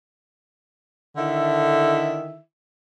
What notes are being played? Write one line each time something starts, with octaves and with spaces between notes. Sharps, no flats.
D3 D#3 E4 A4 E5